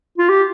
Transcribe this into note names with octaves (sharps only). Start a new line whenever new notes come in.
F4
G4